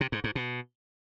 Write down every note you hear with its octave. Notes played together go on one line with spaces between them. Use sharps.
C3
G#2
G#2
B2